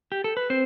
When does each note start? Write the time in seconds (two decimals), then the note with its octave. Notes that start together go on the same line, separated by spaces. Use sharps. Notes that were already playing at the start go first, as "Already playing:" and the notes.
0.12 G4
0.24 A4
0.37 B4
0.50 C4 C5